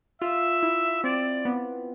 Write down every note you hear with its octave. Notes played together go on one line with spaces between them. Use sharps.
F4 E5
E4
C4 D5
B3